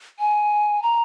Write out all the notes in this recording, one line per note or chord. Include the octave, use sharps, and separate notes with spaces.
G#5
A#5